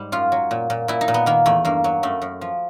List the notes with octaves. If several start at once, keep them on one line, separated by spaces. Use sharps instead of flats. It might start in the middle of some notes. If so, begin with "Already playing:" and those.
Already playing: G#2 G3
F#2 F4
F#3
A#2
A#2
A#2 E4
D#4
A#2
B3
D#3 A#3
E2 A3
G2 A#3
F#3
F#2 A3
F#2
F3